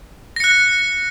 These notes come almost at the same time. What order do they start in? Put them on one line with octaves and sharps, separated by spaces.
A#6 C#7 F#6